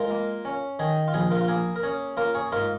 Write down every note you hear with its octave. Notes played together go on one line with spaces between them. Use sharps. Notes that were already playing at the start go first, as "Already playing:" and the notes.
Already playing: G#3 F4 A#4
A#3
C#4
D#3 G#4
F4
A#1 G#4
F4 A#4
F4
A#3 G#4
A#4
C#4 G#4
A#3 F4 A#4
G#4 C#5
G#2 F4 A#4